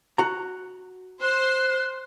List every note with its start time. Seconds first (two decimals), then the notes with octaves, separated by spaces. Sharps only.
0.18 F#4 A#5
1.21 C5 F#6